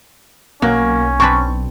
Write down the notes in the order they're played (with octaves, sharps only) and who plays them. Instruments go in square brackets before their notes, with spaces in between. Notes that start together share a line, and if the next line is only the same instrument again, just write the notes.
[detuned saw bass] B1 [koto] F#3 [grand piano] A#3 [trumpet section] C#4
[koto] C4 D4 B4 [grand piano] C#6